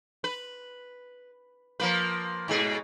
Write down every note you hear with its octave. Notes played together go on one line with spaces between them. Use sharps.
B4
F3 A#3 B4
G#2 B2 G#4